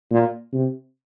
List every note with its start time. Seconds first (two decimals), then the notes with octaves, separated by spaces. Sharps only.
0.11 A#2
0.53 C3